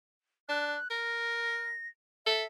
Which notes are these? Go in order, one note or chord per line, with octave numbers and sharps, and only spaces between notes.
D4 F#6
A#4 A#6
A4 E5